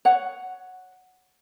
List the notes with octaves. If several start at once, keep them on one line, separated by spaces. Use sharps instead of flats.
C#5 F#5